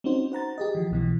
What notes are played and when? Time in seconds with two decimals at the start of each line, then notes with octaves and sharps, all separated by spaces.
0.04 C4 C#4 D#4 F#4 C5
0.32 C5 F#5 A#5 A6
0.58 G4 G#4 D#5
0.75 E3 F3
0.91 B1 B2 E3